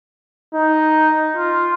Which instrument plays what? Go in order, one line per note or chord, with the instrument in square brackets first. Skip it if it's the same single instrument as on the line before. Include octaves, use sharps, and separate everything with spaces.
[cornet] D#4
F4